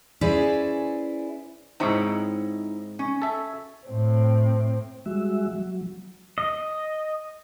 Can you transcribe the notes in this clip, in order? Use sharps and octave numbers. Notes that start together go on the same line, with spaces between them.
C#4 E4 G#4 B4 C5 D5
G#2 C4 D#4 E4 C#5
C#4
A4 E5
A2 C4
G3 G#3 F#4 E5
F#3
D#5